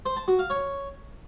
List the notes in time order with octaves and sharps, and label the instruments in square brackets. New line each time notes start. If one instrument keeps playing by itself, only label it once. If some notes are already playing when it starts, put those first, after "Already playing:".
[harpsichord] C5
A5
F#4
F5
C#5